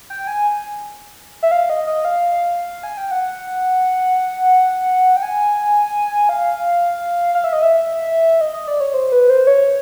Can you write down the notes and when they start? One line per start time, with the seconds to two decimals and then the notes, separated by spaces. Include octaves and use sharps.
0.10 G5
0.27 G#5
1.43 E5
1.51 F5
1.70 D#5
1.87 D#5
2.05 F5
2.83 G#5
2.98 G5
3.11 F#5
5.17 G5
5.23 G#5
6.29 F5
7.35 F5
7.44 E5
7.53 D#5
7.62 E5
8.41 D#5
8.54 D#5
8.67 D5
8.80 C#5
8.94 C5
9.12 B4
9.30 C5
9.47 C#5